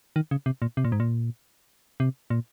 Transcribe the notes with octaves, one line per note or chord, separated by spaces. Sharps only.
D#3
C#3
C3
A#2
C3
A#2
G#2
A#2
C3
A#2